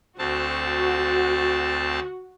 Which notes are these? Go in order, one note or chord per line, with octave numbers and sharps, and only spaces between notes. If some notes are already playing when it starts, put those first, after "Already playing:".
D2 C4 F#4 A5